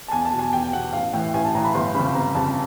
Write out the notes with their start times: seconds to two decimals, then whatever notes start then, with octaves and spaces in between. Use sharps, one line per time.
0.08 A5
0.12 E2 G#5
0.25 A5
0.33 B2
0.39 G#5
0.53 E2 G5
0.73 B2 F#5
0.93 A1 F5
1.13 A2 E3 G5
1.34 A1 G#5
1.44 A5
1.54 A2 E3 A#5
1.65 B5
1.74 G1 C6
1.94 F2 C#3 B5
2.15 G1 A#5
2.35 F2 C#3 A5